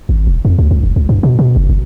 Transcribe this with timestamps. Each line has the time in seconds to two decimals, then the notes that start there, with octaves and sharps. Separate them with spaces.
0.09 G#1
0.27 E1
0.45 F2
0.58 D2
0.71 C#2
0.83 F1
0.96 C#2
1.09 G2
1.23 B2
1.39 B2
1.56 F#1
1.69 F#1